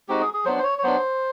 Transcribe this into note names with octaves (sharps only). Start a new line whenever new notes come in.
G#3 C4 D#4 F#4 G4
G#4
G#4
F#3 B3 D4 C5
C5
C#5
C#5
F#3 B3 D4 C5